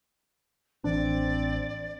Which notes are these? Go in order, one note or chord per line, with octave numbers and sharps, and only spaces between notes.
A1 E3 C4 D4 D5